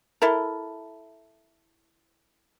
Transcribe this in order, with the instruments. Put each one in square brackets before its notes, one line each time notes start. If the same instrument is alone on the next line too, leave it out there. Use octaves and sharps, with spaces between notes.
[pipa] E4 A4 A#4